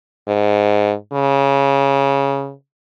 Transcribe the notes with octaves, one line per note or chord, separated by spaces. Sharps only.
G#2
C#3